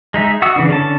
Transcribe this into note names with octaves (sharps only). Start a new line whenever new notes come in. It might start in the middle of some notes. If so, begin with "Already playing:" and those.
G#3 D#4 E5
F#4 F#5 D#6 E6
C#3 E3 D4
D3 C#4 A5